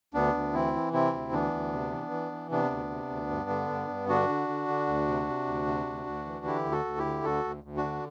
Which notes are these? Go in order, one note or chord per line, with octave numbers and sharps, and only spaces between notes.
D2 B3 D4
D2
E3 C4 E4
E3
C3 C4 E4
D2
E3 B3 D4
D2
C3
E3
E3
E3
C3 B3 D4
D2
C3
D2
G2
D3
G2
G2
D3 D4 F#4
D3
D3
D3
D2
C3
C3
D2
C3
D2
D2
E3
D3 E4 G4
D2
F#4 A4
D2
E4 G4
D3
D2 F#4 A4
D2
D2
D4 F#4
D3